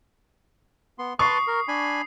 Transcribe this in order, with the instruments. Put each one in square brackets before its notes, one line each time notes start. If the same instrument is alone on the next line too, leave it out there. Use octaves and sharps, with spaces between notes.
[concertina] B3 C6
[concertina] B4 A5 C6 [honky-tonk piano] C#6 [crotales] D#6 C7
[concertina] A#4
D4 G#5 B5